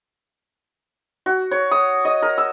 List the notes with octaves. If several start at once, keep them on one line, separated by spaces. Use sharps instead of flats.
F#4
C#5
D#6
D#5
A#4
E6